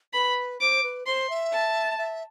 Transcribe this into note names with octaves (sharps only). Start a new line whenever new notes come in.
B4 B5
C5 D6
B4
C5 C6
E5
A5
E5